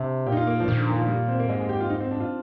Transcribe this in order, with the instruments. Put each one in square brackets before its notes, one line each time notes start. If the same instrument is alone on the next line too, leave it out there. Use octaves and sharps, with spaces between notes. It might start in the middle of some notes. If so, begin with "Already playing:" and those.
Already playing: [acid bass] C3 [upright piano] D4
[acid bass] A#2 [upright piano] G4
[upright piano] D#4
F4
A#3
F3
[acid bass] A#2 [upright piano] D#3
[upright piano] D3
D#3
F3
G3
C4
A#3
[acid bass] G#2 [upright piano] G#3
[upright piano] G#3
G4
F4
D#4
C4
D4
F4